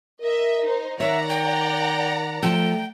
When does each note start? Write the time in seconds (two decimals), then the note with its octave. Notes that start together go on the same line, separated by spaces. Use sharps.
0.21 A#4 D#5 E5
0.64 D#4 C5
1.00 D#3 C#5 D5 E5 F#5 A#5
1.29 G5
2.43 F3 A3 A4 G5